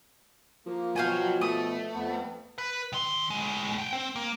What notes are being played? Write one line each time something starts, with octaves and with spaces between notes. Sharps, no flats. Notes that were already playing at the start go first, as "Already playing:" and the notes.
F3 A#3
B2 F#4 C#5 F5 G5 G#5
A3 D#6
F2 B3
B4
D#3 C6
A2 G#3
F#5 G5
C4
A#3